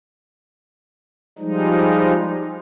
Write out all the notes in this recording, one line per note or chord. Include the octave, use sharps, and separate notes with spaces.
F3 G3 G#3 D#4